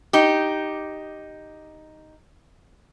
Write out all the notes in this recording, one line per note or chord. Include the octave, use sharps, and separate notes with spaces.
D#4 G4